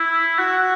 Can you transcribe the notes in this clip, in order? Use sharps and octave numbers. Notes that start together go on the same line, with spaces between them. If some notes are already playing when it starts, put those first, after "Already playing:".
Already playing: E4
F#4